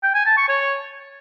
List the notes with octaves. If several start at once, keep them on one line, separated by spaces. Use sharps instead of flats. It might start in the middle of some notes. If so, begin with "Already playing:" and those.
G5
G#5
A5
C#6
C#5